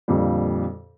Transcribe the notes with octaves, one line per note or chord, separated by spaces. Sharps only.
F2 A#2 D3 G3